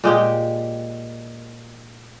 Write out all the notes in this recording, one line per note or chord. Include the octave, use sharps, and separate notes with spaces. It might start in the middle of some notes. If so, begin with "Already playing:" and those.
A#2 G#3 G4